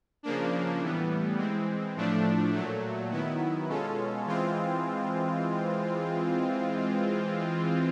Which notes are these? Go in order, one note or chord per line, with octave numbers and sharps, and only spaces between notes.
C#3 F3 A#3 D4
A2 E3 G3 B3
E3 G#3 C4
A2 F3 A3 D4
A#2 F#3 A3
D#3 F#3 B3 E4
B2 G#3 C#4 F4 A4
E3 G#3 C4 F4